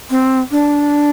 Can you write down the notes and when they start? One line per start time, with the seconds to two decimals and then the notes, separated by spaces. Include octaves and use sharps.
0.10 C4
0.51 D4